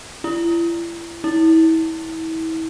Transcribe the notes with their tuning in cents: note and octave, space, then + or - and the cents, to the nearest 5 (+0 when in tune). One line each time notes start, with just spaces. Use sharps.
E4 +40
E4 -30